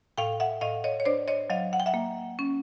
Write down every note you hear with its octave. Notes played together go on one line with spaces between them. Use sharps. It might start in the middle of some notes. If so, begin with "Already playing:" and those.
A2 F5 G5
E5 F#5
A2 D#5 F5
C#5 D#5
C#5
D4 C5 D5
C#5 D#5
F#3 D#5 F5
F#5
G5
E5 F#5
A#3
C#4